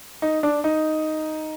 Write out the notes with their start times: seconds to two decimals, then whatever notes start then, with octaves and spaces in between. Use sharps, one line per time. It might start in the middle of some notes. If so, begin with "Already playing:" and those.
0.22 D#4
0.43 D4
0.64 D#4